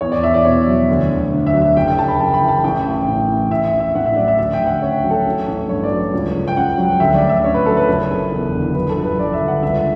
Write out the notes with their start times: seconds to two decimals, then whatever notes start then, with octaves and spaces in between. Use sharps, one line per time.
0.01 E2 C#5
0.12 D5
0.23 E2 E5
0.34 D5
0.45 B2 C#5
0.67 F#3
0.89 D2
1.10 D2
1.32 D3
1.46 E5
1.54 F#3
1.62 E5
1.76 F#1 G5
1.88 G5
1.99 F#1 A5
2.08 B5
2.19 F#2 A5
2.34 B5
2.41 E3
2.48 A5
2.64 A1 G5
2.86 A1
3.07 A2
3.29 E3
3.50 A1 E5
3.65 E5
3.73 A1
3.80 E5
3.95 A2 F#5
4.05 E5
4.16 F#3 D5
4.28 E5
4.38 D2 E5
4.53 G5
4.59 D2
4.67 F#5
4.82 C#3 C#5
5.04 F#3
5.10 A4
5.26 A1
5.47 A1
5.69 G2 C#5
5.83 D5
5.91 F#3
6.13 C#2
6.34 C#2
6.48 G5
6.57 C#3 F#5
6.78 F#3
7.00 D2 E5
7.15 D5
7.22 D2
7.29 E5
7.44 C#3 C#5
7.54 B4
7.66 F#3 A4
7.77 B4
7.88 F#1
8.10 F#1
8.31 E2
8.54 D3
8.75 F#3 B4
8.89 A4
8.96 G1
9.04 B4
9.18 G2 D5
9.33 E5
9.41 D3
9.48 F#5
9.62 C#2 E5